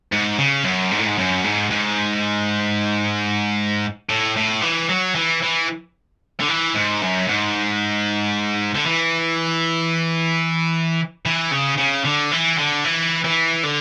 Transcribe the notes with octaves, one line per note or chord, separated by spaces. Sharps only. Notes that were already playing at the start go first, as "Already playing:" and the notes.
G#2
C#3
F#2
G#2
A2
G#2
F#2
G#2
G#2
A2
A2
E3
F#3
E3
E3
D3
E3
G#2
F#2
G#2
D3
E3
E3
C#3
C#3
D3
E3
D3
E3
E3
D3